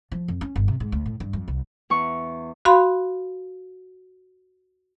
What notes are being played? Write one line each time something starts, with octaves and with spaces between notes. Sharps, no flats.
F3
F2
C#4
G1
C3
G#2
D2
A2
G2
F2
C2
E2 C#6
F#4 F5 B5 C6